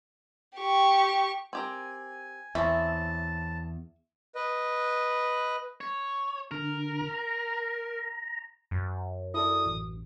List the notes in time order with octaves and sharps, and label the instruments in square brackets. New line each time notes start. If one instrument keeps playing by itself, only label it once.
[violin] G4 C#6
[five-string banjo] C4 G4 A#4 [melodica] G#5
[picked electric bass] E2 [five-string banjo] E3 C4 C#4 [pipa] E5 [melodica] A5
[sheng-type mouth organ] B4 D#5
[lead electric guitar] C#5
[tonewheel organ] D3 [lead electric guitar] A#4
[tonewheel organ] A#5
[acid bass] F#2
[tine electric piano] E4 A4 D5 [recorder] D#6
[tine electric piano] A1